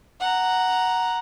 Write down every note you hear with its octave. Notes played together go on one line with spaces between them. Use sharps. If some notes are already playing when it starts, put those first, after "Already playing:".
F#5 A#5